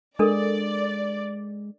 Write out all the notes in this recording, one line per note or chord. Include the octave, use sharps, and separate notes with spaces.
G#3 D4 A4 A#4 D5